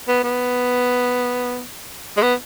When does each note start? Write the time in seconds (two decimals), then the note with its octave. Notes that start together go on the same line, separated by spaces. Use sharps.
0.08 B3
0.24 B3
2.17 G#3
2.22 B3